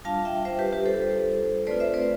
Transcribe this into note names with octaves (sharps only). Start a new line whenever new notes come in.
G3 D4 F4 F5 A5
E5 G5
C5 E5
G4 B4
G4 B4
A4 C5
A3 C4 F4 B4 D5
C5 E5
B4 D5